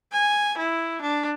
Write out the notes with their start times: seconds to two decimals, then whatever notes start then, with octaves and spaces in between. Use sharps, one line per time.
0.12 G#5
0.58 E4
1.02 D4